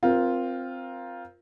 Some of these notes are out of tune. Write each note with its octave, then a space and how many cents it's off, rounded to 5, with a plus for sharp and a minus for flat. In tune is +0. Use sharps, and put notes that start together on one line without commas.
C4 +0 F4 +0 A#4 +20